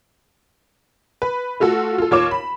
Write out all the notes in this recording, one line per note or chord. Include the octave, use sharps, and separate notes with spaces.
B4
A3 F4 F#4 A4
F4 A4
D#2 F4 C#5 D6 E7
B5